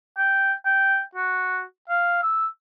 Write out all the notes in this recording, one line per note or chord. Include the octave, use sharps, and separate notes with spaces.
G5
G5
F#4
F5
E6